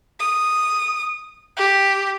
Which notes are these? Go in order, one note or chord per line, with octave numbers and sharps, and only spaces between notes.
D#6
G4